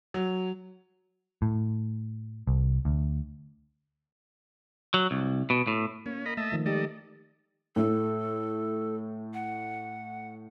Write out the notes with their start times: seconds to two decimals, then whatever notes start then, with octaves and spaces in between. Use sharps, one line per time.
0.14 F#3
1.42 A2
2.47 C2
2.85 D2
4.94 F#3
5.11 C2
5.50 B2
5.67 A2
6.06 A#3 C#4
6.26 A#4 D#5 B5
6.37 A3 D#5 E5 A5
6.52 D#3 F3
6.66 G#3 D#4 G4 A4 D5 D#5
7.76 A2 A4
9.34 F#5